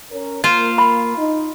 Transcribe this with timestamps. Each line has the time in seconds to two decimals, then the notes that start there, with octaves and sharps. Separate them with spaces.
0.10 C#4 A#4
0.44 A#3 F4 C5
0.78 B5
1.18 D#4